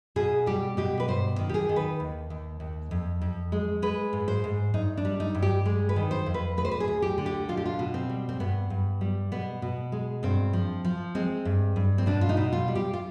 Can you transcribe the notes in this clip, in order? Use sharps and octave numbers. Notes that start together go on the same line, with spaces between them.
B2 G#4
G3 G4
B2 G4
B4
G2 C5
D#3
G4
G#4
D#3
B4
D#2
D#2
D#2
F2
F2
G#3
G#3 B4
G#2
C5
G#2
G2 D#4
D4
G3
D#4
G2
G4
G#3
B4
D#3
C5
F2
B4
D2 B4
C5
B4
G#4
D2
G4
D3
G4
B2 F4
G4
F4
B2
C4
G3
C4
G2 B3
G2
G3
B2 B3
B2
G#3
G2 C4
F3
F3
G#3 C4
G2
G2
C4
B2 D4
F4
D#4
B2
F4
G3
G4
F4